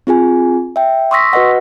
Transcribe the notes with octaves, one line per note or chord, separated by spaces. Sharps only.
C4 F4 G#4 G#5
E5 G5
C6 C#6 D#6 E6 A#6 B6
F#4 B4 D#5 F#5